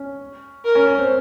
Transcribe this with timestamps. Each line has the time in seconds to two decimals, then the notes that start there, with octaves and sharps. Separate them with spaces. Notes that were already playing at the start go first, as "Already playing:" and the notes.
Already playing: C#4
0.65 A#4
0.75 C#4
0.87 C#4
0.99 C4